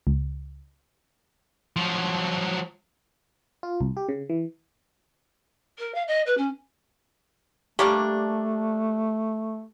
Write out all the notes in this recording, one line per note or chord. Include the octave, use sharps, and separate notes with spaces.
C#2
F3 F#3
F4
C2
G4
C#3
E3
A#4
F5
D#5
B4
C#4
G3 A3 A#3 D4 G4